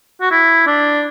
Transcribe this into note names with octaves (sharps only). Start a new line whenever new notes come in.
F#4
E4
D4